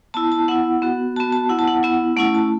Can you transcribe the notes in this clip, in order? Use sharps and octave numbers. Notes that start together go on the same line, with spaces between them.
B3 E4 A5
A5
B3 E4 F#5
B3 F#4
B3 F#4 A5
A5
B3 E4 F#5
A5
F#5
B3 E4
A3 C#4 E4 F#5
A5